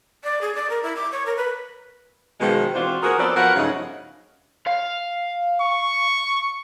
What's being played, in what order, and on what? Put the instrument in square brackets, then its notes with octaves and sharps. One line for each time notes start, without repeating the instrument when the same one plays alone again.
[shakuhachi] D5
G#4
D5
A#4
E4
D6
C#5
A#4
B4
[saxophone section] B2 D#3 F3 G#3
E3 C4 D4 F4 F#4 C5
F#4 G#4 A#4
F3 B3 C4 A4 D5
F3 B3 F#4 A#4 F#5
G2 C#3 F3 F#3 A3 D#4
[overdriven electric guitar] F5
[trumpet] C#6